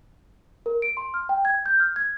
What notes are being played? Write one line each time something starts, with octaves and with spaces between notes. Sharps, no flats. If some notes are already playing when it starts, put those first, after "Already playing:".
A#4
D7
C6
F6
G5
G#6
G6
F6
G#6